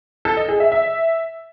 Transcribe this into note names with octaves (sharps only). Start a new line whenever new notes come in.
A4
D#5
G#4
E5
E5